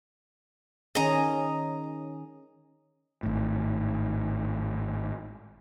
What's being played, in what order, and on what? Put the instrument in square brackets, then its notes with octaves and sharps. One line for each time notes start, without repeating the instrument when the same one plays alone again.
[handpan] D#3 C#4 G#4 [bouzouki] D#5 A#5
[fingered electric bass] G#1 A2